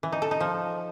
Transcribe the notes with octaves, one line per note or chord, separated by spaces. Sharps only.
E3
D#4
A4
D#4
F3